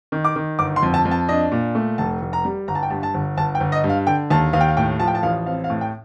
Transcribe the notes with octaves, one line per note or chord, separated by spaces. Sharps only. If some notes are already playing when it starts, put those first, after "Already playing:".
D#3
D6
D#3
G1 D6
C6
F2
A5
F2
A5
D4 D#5
A#2
A3
F1 A5
F1
A#5
G3
G1 A#5
A5
G5
G2 A5
A5
G1
G1 A5
G5
G1
D#5
G2
F5
D3 G5
D#2 A5
D#2 F5
G5
F5
A2 G5
F3 A5
G5
A5
A1 F5
C4 F5
F5
A2
G5